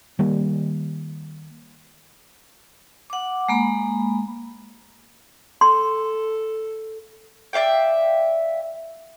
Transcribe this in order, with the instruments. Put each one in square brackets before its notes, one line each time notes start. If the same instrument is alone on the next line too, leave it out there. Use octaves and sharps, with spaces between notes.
[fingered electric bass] D#3 G3 A#3
[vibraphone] F#5 D6
G#3 A#3 B5
[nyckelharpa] A4 [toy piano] C6
[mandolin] D5 E5 F5 G5